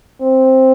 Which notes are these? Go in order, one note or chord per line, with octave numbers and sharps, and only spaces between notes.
C4